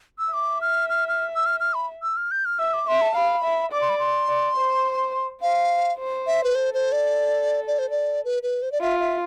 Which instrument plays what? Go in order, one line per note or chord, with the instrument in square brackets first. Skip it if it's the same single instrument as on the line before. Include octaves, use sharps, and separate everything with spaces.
[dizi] E6
[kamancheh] E5 [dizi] D6
[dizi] F6
F6
F6
E6
F6
F6
B5
E6
F6
G6
F6
[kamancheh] E5 [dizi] E6
[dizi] D6
[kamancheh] E5 [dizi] C6
[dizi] A5
[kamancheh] F5 [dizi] B5
[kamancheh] E5
[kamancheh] D5 [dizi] D6
[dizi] C6
B5
C6
[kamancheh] D5
C5
[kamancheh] C5 [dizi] F5
[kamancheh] C5
[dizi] E5
B4
[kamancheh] A4 [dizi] C5
[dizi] C5
D5
D5
C5
D5
B4
B4
C5
D5
[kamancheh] F4 [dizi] E5
[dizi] E5